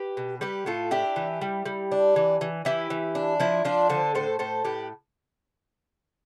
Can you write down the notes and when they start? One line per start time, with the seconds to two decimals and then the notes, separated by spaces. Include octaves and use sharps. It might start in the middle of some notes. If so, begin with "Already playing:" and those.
Already playing: G4 B4
0.17 B2
0.41 G3 G4 B4
0.66 A2 F4 A4
0.91 D4 E4 G4
1.16 E3
1.41 G3
1.66 G3
1.92 D4
2.16 E3
2.41 E3
2.65 E3 E4 G4
2.90 E3
3.15 D4
3.40 F3 E4
3.65 F3 D4 F4
3.90 D3 A4 C5
4.15 A2 A4 C5
4.39 A2 A4 C5
4.64 A2 G4 B4